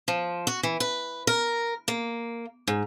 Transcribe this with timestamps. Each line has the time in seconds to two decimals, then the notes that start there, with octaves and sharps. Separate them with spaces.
0.08 F3
0.47 F#4
0.63 E3
0.80 B4
1.27 A#4
1.88 A#3
2.68 G#2